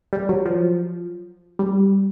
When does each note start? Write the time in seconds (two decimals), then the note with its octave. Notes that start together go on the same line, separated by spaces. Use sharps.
0.13 G3
0.29 F#3
0.45 F3
1.59 G3